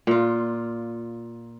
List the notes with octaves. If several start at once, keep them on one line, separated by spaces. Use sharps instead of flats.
A#2 F4